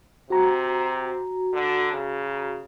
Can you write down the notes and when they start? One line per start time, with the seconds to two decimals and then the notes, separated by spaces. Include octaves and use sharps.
0.30 C3 F#4 A#5
1.53 D3
1.92 C#3